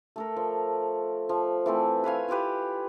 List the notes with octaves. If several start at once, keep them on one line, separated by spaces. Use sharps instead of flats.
A3 A4 A#4
F3
F3
E3 A3 C4
B4 C#5 F5 G#5
E4 F4 G4 B4